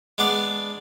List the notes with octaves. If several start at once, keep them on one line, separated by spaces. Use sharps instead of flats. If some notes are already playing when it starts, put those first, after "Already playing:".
G#3 B3 D4 D5 F5